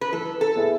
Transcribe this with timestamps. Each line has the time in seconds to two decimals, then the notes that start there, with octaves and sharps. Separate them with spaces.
0.01 B4
0.12 E3 A4
0.41 A4
0.55 B3 E4 G#4